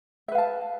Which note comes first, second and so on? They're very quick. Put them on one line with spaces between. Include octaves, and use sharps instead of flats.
E5 B4 F5 A5